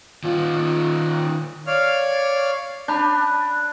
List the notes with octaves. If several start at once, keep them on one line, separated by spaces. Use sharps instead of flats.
D#3 F4
C#5 D5 F5 F6
D4 A5 B5 G6